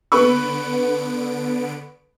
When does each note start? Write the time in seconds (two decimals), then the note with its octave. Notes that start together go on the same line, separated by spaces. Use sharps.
0.12 D3 B3 B4 B5 C#6 D7